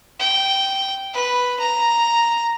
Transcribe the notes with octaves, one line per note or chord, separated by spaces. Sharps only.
G5
B4
A#5